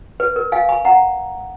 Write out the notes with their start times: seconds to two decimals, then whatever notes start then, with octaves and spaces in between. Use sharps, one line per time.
0.20 B4
0.36 A#4
0.52 F5 G#5
0.69 G#5 B5
0.85 F#5 A#5